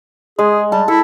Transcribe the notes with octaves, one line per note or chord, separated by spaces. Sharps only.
G#3 G#4
G3 A5
E4 A4